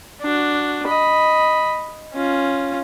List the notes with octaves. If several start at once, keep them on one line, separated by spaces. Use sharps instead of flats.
D4 F#4
D#5 B5
C#4 F4